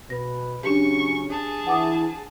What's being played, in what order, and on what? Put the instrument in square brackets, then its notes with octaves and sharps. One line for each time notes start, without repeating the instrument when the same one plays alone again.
[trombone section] B2 B4 [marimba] A#6
[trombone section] C#3 F#3 C#4 [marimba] D4 G4 [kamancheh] C#6
[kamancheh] G#4 A5
[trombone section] E3 [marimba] F#5 D6 D#6